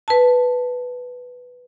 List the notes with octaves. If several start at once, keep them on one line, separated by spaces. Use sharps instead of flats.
B4 A5